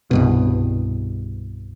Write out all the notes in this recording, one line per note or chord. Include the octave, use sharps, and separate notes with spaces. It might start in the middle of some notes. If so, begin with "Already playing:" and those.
C2 G2 B2